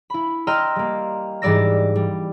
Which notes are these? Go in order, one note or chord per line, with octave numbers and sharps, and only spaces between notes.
E4 B5
D#5 G5 A#5 C6 E6 F6
G3 A#3
G#2 E3 G3 D5 E6 A#6
G3